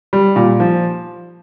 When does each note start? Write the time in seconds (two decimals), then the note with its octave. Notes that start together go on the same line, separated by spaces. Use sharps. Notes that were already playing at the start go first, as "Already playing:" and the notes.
0.13 G3
0.36 A#2
0.60 F3